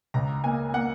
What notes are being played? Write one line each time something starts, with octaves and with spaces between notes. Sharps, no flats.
C#2 A#5
A#3 G#5
A#3 F#5